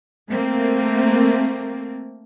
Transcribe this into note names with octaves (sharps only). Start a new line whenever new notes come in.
A3 A#3 C4